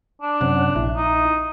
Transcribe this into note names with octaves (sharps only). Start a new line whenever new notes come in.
D4
F#2 C3 C#4 F#5
A#1 E4
D#4